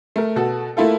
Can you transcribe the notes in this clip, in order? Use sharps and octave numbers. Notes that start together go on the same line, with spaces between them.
A3 A#4
B2 F#4 A4
A3 A#3 E4 F4 A4